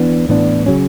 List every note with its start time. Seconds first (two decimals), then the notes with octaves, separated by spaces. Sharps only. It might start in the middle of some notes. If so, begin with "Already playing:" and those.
Already playing: E3 B3 D4
0.29 A2 E3 B3 D4
0.66 C#3 F#3 C#4